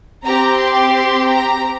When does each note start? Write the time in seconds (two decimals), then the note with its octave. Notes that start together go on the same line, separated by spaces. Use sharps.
0.24 C4 G4 A#5
0.58 C6
1.28 A#5